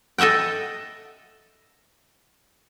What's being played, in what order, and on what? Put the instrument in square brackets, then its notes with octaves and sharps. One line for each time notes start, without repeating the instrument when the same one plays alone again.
[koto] A4 D#5 E5 F#5 G5